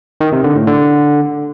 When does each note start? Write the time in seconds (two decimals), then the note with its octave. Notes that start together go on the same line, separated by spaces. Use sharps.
0.21 D#3
0.32 C3
0.44 D3
0.56 A2
0.68 D3